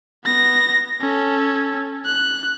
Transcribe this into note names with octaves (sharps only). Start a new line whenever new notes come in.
B3 A#6
C#4 A4
F#6